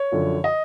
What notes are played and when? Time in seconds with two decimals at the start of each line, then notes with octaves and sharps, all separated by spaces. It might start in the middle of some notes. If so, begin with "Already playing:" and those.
Already playing: C#5
0.12 F#2 D3 F3
0.44 D#5